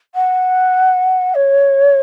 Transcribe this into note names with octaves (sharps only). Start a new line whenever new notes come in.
F#5
C#5